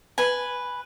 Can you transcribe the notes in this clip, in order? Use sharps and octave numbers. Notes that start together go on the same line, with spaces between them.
B4 G#5